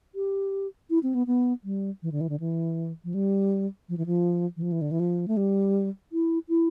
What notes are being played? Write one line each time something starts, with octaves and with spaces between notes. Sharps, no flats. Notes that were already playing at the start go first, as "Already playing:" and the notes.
G4
E4
C4
B3
B3
G3
E3
D3
E3
D3
E3
F3
G3
F3
E3
F3
E3
F3
E3
D3
E3
F3
A3
G3
E4
E4